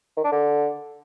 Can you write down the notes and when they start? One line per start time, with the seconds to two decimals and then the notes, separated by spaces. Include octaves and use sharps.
0.17 D#3
0.24 D4
0.31 D3